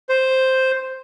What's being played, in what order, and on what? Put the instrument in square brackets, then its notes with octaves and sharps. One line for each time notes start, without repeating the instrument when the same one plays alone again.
[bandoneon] C5